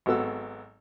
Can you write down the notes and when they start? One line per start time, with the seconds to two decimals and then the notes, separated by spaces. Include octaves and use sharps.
0.06 G#1 F#3 B3 A4 E6